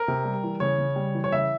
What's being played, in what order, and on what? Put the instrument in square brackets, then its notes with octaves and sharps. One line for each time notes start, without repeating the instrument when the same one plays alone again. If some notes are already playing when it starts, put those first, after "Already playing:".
Already playing: [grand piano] A#4
C3
G3
E3
C#3 C#5
C#3
G3
E3
C#5
C#3 E5